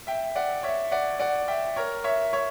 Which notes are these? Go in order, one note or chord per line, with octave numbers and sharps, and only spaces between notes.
E5 G5
D5 F#5
C#5 E5
D5 F#5
D5 F#5
E5 G5
A#4 C#5
C#5 E5
C#5 E5